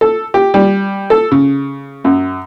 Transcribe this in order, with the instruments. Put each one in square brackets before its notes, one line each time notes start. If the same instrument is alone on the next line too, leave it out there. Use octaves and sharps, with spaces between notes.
[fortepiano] A4
G4
G3
A4
C#3
F#2